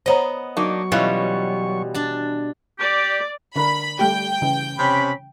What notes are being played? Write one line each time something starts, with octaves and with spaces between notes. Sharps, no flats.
B3 C5 C#5 D#5 A#5
F#3 A#3 D4 D#4 C#6
B2 E3 G3 C#4 F4
D4 A5
G4 D5
D3 D4 A#4 B5
G3 A3 G4 G5
C#3 E3
C3 C#4 B5